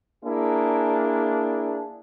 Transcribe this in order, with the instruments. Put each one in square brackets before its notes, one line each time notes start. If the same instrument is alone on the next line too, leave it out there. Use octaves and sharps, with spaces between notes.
[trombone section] A#3 D4 E4 G#4